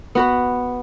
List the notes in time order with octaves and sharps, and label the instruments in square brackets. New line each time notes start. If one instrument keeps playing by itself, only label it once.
[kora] B3 F#4 B4